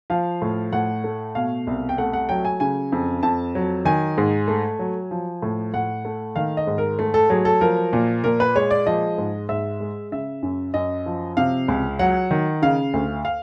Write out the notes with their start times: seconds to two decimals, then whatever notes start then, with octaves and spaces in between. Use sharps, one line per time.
0.10 F3 F5
0.42 A2
0.72 A2 F#5
1.04 A3
1.35 B2 F5
1.67 C2
1.89 G5
1.98 A3 F#5
2.13 F#5
2.29 F#3 G5
2.45 G#5
2.60 C#3 G#5
2.92 F2
3.23 F2 A5
3.55 F#3
3.85 D#3 G#5
4.18 G#2
4.48 A3
4.79 F#3
5.11 F3
5.42 A2
5.74 A2 F#5
6.05 A3
6.36 D#3 F5
6.57 D#5
6.67 G#2
6.78 A#4
6.99 A3
7.14 A4
7.30 F#3 G#4
7.45 A4
7.61 F3 A#4
7.93 A#2
8.24 A#2 A#4
8.40 B4
8.55 G#3 C#5
8.71 D5
8.86 F3 D#5
9.18 G#2
9.49 G#2 E5
9.80 G#3
10.12 C#3 E5
10.43 F#2
10.74 F#2 D#5
11.06 F3
11.37 C3 F5
11.68 C#2
11.99 F#3 F#5
12.31 D#3
12.62 C#3 F5
12.93 D2
13.25 F5